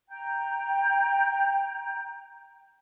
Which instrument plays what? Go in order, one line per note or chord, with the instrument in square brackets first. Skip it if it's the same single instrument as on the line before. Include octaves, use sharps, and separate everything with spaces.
[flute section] G5 A#5 G6